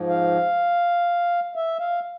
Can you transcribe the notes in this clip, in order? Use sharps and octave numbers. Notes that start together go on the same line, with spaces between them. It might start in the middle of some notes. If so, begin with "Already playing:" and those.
Already playing: G#2 F3
F5
E5
F5